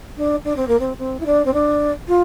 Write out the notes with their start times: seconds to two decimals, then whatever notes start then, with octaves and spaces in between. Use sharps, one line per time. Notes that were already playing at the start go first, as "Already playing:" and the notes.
0.17 D4
0.44 D4
0.56 C4
0.68 A#3
0.79 C4
0.98 C4
1.20 E4
1.26 D4
1.45 C4
1.53 D4
2.08 F4